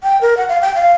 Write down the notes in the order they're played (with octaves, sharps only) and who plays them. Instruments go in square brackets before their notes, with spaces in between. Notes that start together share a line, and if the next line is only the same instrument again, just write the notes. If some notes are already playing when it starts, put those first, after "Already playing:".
[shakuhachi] G5
A#4
F#5
F5
G5
F5